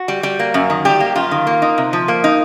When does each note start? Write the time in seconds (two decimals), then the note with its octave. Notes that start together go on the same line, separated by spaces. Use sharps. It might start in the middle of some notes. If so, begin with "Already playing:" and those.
Already playing: F#4
0.08 G3
0.23 G3
0.39 A#3
0.54 F#2
0.70 D#3
0.85 G3 G4
1.00 A#3
1.16 F#2 F4
1.31 D#3
1.47 A#3
1.62 D#4
1.78 C3
1.93 F3
2.08 A#3
2.24 D#4